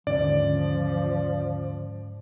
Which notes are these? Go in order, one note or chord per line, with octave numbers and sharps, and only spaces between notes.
D#2 G#2 D3 F3 C#4 D5